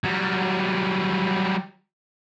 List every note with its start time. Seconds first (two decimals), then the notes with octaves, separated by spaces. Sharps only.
0.04 F#3 G3